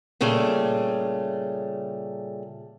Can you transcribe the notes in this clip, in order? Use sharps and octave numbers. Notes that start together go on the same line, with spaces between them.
A#2 C#3 G3 A3